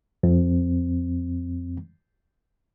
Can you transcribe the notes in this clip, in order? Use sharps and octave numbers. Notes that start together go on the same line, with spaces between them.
F2 C4